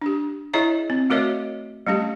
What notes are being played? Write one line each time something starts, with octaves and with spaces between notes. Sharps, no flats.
D4 G4
E4 G#4 C#5 D#5 E5 A#5
C4
A3 F#4 A#4 C#5 D#5 E5
G3 A3 C#4 G4